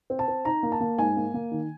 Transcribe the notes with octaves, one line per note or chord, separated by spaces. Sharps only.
C4
A5
C4
D#4 A#5
A#3
A5
A#3
G#2 G#5
A#3
A#3
D#3